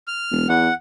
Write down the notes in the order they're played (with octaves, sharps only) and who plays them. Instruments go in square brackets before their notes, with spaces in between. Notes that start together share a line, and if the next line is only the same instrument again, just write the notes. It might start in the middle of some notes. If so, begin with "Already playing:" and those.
[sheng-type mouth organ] F6
[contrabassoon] E1
[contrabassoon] E2 [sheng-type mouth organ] F#5